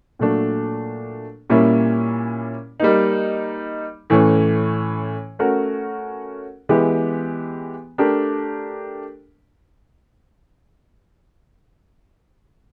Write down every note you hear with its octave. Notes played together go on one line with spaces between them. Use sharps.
A#2 F#3 A3 D4
A#2 G3 A#3 C#4 E4
G3 A#3 D#4
A2 E3 A3 C#4
A3 C#4 F#4 A#4
E3 G#3 B3 E4 G4
A3 D4 G4 A#4